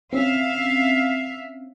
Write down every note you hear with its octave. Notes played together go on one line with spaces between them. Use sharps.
C4 C#4 E5 F5